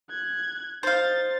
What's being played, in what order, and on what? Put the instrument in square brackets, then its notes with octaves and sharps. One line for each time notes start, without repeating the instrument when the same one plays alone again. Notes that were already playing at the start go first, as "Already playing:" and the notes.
[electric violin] F#6 G#6
[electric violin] D#4 A6 [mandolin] C5 F5